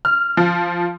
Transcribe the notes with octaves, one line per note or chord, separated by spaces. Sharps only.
F6
F3